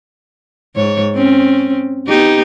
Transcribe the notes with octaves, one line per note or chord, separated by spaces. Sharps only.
G#2 C#5
C4 C#4
B3 D#4 G4